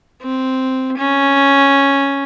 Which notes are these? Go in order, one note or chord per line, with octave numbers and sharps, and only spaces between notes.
C4
C#4